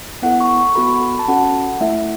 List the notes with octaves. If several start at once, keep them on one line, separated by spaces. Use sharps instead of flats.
B3 E4 A4 F#5
C#6
C#6
B3 F#4 A4 B5
A5
C#4 F#4 A4 F#5
A3 E4 A4 E5